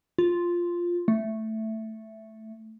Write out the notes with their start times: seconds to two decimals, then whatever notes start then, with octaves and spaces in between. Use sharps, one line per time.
0.19 F4
1.08 A3